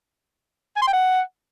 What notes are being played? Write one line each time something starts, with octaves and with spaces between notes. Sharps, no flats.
G#5
C6
G5
F#5